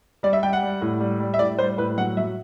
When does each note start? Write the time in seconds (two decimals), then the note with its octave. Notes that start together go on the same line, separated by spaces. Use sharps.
0.23 G3 D5
0.33 E5
0.43 G3 G5
0.53 F#5
0.63 G3
0.81 A2
1.00 G3
1.20 G3
1.34 E5
1.39 A2 D5
1.58 G3 C5
1.78 A2 B4
1.97 F#3 F#5
2.17 F#3 E5